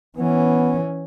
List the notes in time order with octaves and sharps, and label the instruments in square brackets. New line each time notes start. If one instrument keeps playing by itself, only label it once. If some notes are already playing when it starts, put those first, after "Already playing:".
[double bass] E3 C#4 [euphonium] B3